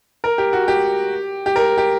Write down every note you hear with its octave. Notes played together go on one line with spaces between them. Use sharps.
A#4
G4
F#4
G4
G4
A#4
G4